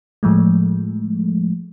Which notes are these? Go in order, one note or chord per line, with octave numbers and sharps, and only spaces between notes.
A2 F3 G#3 A3